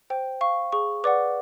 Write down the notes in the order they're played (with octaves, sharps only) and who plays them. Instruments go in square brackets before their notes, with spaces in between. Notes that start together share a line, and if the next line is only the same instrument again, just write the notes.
[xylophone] C5 G5
F5 C#6
G#4 C#6
B4 D5 F#5 D6